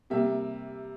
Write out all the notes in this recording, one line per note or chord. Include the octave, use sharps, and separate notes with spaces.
C3 G3 A#3 E5